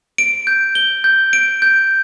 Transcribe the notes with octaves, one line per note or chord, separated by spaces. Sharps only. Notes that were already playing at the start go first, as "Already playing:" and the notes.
D7
G6
G7
G6
D7
G6